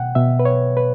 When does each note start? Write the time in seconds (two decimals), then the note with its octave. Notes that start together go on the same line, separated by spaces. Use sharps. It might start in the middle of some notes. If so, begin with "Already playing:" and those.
Already playing: B2 F#5 G5
0.15 B2 E5
0.39 B4
0.45 C#5
0.77 B4